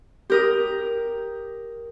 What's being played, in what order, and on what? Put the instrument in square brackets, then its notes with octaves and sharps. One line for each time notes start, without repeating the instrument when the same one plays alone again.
[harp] G4 A#4 D#6